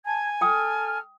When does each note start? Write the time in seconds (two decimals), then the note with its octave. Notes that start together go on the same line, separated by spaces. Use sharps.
0.05 G#5 A5 G#6
0.41 A4 G5 D#6 F6